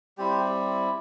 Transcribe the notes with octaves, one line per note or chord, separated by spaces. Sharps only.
G3 C4 E4 G4